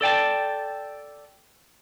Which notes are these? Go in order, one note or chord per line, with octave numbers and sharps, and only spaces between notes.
A4 D5 G5 A5